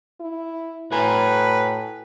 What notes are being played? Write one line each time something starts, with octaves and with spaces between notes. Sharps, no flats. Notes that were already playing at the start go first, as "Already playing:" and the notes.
E4
A2 F#4 B4 G#5 A#5